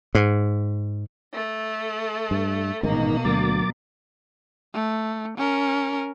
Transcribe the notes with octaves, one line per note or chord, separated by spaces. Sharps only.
G#2
A3
G2
A1 G#2 B2 D#3 A#3 D#4
D2 F#3 D6 A6
A3
C#4 A#4